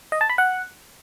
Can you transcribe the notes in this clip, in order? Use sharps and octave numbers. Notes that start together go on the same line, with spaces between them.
D#5
A5
B5
F#5